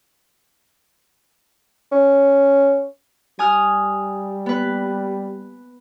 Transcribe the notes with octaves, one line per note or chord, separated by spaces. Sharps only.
C#4
G3 G#5 D#6 F6
B3 B4